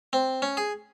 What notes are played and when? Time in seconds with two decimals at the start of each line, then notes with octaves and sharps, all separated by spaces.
0.13 C4
0.42 C#4
0.57 G#4